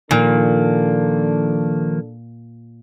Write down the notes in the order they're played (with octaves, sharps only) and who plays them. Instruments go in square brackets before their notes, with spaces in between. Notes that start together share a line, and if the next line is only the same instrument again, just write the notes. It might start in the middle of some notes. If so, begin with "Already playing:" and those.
[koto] A#2 [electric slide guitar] D#3 F3 A#3 [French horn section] D4 A4